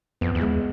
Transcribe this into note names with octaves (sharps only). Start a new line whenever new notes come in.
F2 B3
E2
G#3